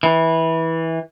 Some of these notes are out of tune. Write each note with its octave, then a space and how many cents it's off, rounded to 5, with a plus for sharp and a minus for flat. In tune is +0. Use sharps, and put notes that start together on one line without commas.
E3 -15